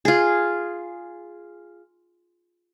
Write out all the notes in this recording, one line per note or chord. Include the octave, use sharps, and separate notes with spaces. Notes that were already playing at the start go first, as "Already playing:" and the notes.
F4 G#4